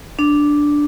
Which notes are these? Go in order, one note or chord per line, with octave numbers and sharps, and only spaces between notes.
D4